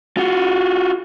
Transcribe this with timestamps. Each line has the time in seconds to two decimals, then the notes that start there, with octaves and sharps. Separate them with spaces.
0.17 F4 F#4